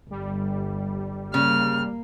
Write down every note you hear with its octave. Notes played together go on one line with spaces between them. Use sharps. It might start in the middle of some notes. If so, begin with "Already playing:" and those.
G1 G3
C#3 A#3 F6